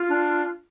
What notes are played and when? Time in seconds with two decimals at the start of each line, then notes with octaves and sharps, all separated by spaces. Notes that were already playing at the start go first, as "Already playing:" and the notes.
Already playing: F4
0.09 D4